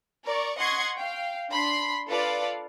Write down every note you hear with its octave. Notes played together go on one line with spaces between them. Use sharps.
A#4 D5 C#6
D#5 F#5 C6 C#6 G#6 C7
F5 G5
D4 B5 C6 B6 C7
F4 A4 B4 D5 F5